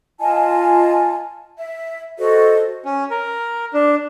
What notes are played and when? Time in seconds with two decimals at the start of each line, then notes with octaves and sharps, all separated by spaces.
0.20 F4 D#5 G#5 A5
1.58 E5
2.18 F#4 A4 C5 D#5
2.85 C#4
3.11 A#4
3.74 D4